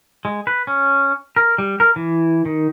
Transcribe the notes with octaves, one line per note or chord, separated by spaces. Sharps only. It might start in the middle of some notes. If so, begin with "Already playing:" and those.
G#3
B4
C#4
A#4
G3
A#4
E3
D#3